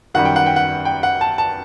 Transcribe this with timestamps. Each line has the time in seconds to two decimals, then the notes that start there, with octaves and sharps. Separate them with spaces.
0.14 F#2 D#3 G3 F#5
0.25 G5
0.36 F#5
0.46 G5
0.56 F#5
0.85 G5
1.03 F#5
1.21 A5
1.38 A5